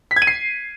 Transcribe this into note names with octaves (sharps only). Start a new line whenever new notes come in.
B6
G#6
D#7
C7